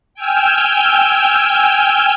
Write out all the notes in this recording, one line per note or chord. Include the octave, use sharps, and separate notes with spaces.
G5 G#5 E6 F6 G6